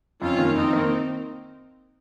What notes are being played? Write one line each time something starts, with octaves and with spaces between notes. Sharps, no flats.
F2 C#4 F4
D#3 A#3
F2 C4 D#4
D#3 A#3